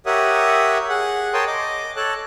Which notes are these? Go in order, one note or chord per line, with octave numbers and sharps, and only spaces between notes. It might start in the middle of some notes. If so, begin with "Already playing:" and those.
G4 A#4 C#5 E5 F#5 D#6
G#4 F#5
A#4 C#5 G5 A5 C6 D#6
D#5 D6
A4 C#5 A5 F#6